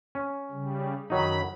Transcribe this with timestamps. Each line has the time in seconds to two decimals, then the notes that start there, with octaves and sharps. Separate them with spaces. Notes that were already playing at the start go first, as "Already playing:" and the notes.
0.15 C#4
0.51 C#3 G3
1.10 F#2 D#3 F#3 D#4 B5